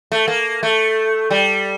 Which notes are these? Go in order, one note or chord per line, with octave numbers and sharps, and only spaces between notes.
A3
A#3
A3
G3